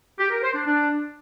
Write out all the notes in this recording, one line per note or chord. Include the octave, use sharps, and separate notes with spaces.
G4
A#4
C5
D4
D4